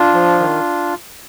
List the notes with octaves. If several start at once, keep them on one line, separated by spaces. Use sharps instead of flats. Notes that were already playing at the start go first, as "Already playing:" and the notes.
Already playing: D4 F4
F3
D#3